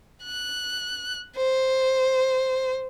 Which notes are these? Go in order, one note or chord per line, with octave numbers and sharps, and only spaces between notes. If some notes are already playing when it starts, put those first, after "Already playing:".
F#6
C5